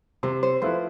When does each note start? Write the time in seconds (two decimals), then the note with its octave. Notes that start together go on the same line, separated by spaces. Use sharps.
0.23 C3 C5
0.43 C5
0.62 F3 A3 E4 B4 C5